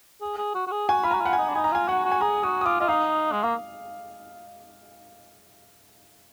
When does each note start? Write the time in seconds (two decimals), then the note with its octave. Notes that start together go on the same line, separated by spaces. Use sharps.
0.21 G#4
0.38 G#4
0.55 F#4
0.67 F#4
0.72 G#4
0.88 F#4 G#5
1.03 F4 B5
1.11 F#4 A#5
1.21 F4 F#5
1.33 G#5
1.38 D#4
1.49 D4
1.55 D#4 G#5
1.64 A#5
1.72 F4 G#5
1.88 F#4 F#5
2.05 F#4
2.12 G#5
2.21 G#4 A#5
2.43 F#4 D#6
2.61 D#6
2.66 F4 D6
2.80 F4 D#5
2.88 D#4 F5
3.32 G#3
3.43 A#3 F5